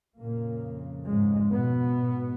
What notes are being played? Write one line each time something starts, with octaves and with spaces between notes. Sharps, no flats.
F2 A#2 C#3 A#3
G#2 G#3
B2 B3
G#2